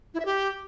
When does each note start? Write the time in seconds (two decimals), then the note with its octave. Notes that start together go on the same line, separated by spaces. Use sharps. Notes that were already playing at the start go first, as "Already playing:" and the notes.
0.14 E4
0.20 E5
0.25 G4